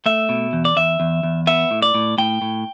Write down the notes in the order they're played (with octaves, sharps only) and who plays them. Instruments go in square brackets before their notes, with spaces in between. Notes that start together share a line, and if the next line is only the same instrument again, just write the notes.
[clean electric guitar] A3 E5
B2
E2
D5
E2 E5
E2
E2
B3 E5
A2
D5
A2
A2 G5
A2